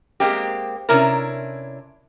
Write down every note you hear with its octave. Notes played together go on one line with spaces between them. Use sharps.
G#3 A#3 C4 G4
C3 C#4 D4 E4 A#4